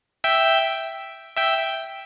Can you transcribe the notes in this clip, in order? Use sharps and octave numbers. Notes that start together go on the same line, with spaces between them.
E5 G5
E5 G5